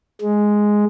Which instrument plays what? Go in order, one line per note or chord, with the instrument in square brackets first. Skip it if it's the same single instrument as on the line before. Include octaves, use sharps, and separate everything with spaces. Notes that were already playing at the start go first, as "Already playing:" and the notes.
[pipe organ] G#3